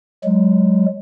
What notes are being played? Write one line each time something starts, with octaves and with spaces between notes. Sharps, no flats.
F#3 G#3